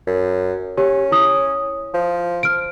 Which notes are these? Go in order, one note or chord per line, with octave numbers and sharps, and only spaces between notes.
F#2
C#4 G4
E4 D#6
F3
F6 D7